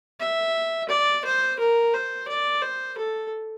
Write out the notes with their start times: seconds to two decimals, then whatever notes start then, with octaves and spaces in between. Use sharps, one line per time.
0.20 E5
0.89 D5
1.24 C5
1.59 A#4
1.94 C5
2.28 D5
2.62 C5
2.98 A4